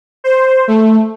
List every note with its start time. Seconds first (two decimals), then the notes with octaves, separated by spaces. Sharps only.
0.24 C5
0.68 A3